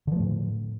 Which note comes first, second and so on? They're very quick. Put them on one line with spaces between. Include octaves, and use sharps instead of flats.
D3 F3 A3 A2